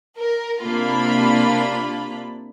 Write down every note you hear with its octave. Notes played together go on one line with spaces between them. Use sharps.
A#4
C3 A#3 D4 F4 B5